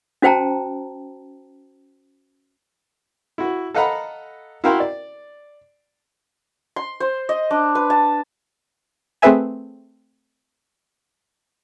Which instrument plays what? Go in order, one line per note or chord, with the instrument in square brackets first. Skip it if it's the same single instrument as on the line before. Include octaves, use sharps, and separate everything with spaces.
[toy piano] C#4 F#4 C5 G5 A5 A#5
[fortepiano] E4 F#4
A4 D#5 F5 F#5 A#5 B5
E4 F#4 A#4 F5 G5 C6
D5
[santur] C6
C5
D#5
D4
B4
A5
[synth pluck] A3 C4 G#4 B4 E5 G#5